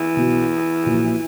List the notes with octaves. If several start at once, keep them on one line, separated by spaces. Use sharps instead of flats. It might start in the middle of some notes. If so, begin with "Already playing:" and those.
Already playing: E3
B1 B2 F#3 B3 F#4
A#1 A#2 F#3